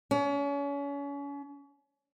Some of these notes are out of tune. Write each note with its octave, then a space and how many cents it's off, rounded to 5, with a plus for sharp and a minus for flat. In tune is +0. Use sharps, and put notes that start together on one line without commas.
C#4 +35